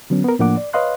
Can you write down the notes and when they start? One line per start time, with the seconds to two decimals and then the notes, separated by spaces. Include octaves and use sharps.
0.10 D3 F#3 B3 C#4
0.24 B3 A#4
0.39 A2 F3 A#3 D4 F#5 D6
0.57 D5
0.73 B4 C#5 D#5 F5 C6 F#6